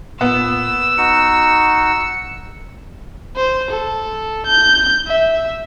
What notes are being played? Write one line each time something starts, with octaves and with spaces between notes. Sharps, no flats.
A#2 B3 E6
D#4 F#4 C#7
C5
A4
G6
E5